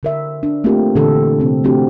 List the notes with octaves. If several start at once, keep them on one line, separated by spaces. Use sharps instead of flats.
D3 A#4 E5
D4
A3 A#3 C4 F4 G4 A#4
A#2 D3 E3 G4 A4
C3 C4
F3 A3 C4 D4 F#4 G4